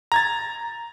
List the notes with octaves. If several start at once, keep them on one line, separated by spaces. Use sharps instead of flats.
A#5 G#6 A6